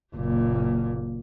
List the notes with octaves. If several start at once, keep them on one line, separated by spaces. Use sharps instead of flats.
F#1 A#2